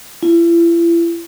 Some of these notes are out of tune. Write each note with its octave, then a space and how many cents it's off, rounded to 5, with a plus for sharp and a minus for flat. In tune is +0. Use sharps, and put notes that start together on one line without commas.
E4 +40